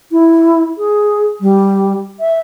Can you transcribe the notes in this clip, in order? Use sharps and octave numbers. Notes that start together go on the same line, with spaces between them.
E4
G#4
G3
E5